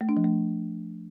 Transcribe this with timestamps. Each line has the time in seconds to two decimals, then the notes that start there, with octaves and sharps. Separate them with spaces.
0.01 A3
0.09 D4
0.17 F3
0.25 A3